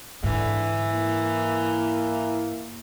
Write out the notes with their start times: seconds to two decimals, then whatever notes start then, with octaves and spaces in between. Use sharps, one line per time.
0.24 G#2 D3 E3
0.91 A#3 E4